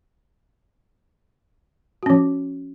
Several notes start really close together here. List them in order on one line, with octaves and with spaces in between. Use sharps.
F#4 C#4 F3